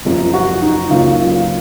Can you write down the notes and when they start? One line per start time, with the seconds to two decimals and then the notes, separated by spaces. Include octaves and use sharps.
0.05 F#1 F#2 F3
0.34 F#4
0.62 D#4
0.90 C#2 C#3 F#3 A#3 F4
1.20 F4